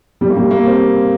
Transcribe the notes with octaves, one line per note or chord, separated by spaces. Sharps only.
G3
A#3
G3
A#3
C4